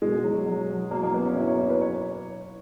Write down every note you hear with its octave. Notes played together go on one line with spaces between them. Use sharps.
B2 G#3
F#3
F#3
F#3
F#3 A#3
A#3
F#3 B3
C#4
B2 E4
C#5
F#3 C#5
B4
F#3 C#5